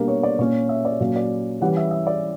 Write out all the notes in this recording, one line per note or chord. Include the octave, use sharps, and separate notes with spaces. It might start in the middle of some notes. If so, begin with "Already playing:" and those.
Already playing: B2 G3 A#3 D4 A#4
C#5
D5
A#2 A#3 C#4 C#5
E5
D5
A#2 F#3 A#3 C#4
D5
E3 G3 C#4 F#5
E5
E5
D5